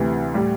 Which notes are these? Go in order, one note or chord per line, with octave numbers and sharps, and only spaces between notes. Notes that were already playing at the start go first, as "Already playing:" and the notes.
Already playing: D2 C3 E3
A2 G3